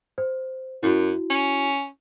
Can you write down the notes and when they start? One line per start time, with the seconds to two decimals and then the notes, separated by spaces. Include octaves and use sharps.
0.18 C5
0.83 F#2 E4 F#4
1.30 C#4